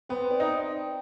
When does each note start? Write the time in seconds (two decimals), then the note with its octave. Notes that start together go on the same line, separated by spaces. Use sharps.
0.09 B3 C4
0.31 D5
0.40 D#4